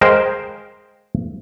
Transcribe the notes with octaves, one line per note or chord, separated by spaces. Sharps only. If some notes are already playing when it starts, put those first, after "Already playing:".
G#3 A#4 C5 F5 G5